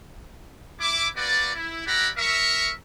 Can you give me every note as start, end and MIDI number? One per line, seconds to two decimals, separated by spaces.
0.80 1.06 64
0.80 1.06 86
1.15 1.51 58
1.15 1.51 66
1.15 1.51 71
1.15 1.51 74
1.54 1.85 64
1.86 2.08 64
1.86 2.08 67
1.86 2.08 74
1.86 2.08 78
1.86 2.08 82
1.86 2.08 83
2.17 2.70 70
2.17 2.70 76
2.17 2.70 85